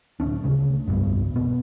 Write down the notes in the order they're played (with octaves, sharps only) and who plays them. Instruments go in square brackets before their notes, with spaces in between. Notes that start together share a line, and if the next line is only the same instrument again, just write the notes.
[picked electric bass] D1 G1 C#4 D4
D2 C#3
F1 C2 G2 B2
B2 B3